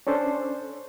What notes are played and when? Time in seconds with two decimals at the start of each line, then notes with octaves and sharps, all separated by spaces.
0.07 C#4 D4 A4 C5